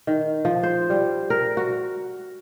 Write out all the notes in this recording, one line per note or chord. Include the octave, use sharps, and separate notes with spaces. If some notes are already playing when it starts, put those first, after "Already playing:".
D#3
F3
C5
G3
A#4
F#4